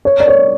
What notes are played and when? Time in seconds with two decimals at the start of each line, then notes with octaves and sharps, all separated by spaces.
0.05 C#5
0.20 D5
0.28 C#5